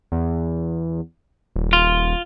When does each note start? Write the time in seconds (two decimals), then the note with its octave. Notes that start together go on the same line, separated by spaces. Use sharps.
0.12 E2
1.56 D#1
1.73 F4